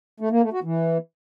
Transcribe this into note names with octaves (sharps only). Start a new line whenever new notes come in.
A3
A#3
A3
F#4
E3